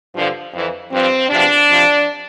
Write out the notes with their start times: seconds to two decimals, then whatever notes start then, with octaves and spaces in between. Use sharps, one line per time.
0.15 G2 D3 F3
0.53 F2 E3
0.92 G2 F3 C4
1.30 E2 C3 F3 D4
1.68 F2 C3 F3